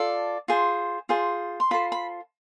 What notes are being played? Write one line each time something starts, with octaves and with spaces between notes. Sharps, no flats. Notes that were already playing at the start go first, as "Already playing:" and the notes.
Already playing: F4 A4 D5
F4 G#4 C5
F4 G#4 C5
C6
F4 A4 C5 B5
B5